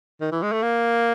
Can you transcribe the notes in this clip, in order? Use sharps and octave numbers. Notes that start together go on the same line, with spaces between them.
D#3
E3
G#3
A3
A#3